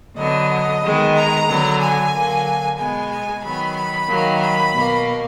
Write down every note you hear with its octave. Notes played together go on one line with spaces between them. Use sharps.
D3 F#3 B3 D#5
D#3 G#3 B3
A#5
D3 F#3 B3
G#5
D3 F#3 A#3
B2 G#3 B3 G#5
G#5
D#3 F#3 B3 B5
B5
D#3 F#3 A#3
B5
B2 A#3